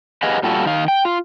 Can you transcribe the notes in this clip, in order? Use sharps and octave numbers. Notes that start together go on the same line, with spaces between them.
G4 G#4 B4 D#5 F5 F#5
A#2 G3 F4 F#4 A4
D#3 F5
G5
F4